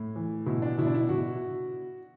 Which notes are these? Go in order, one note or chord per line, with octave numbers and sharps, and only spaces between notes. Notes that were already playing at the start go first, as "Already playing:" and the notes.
Already playing: A2
E3
B2 E4
D4
B2 E4
D4
E4
B2 F#4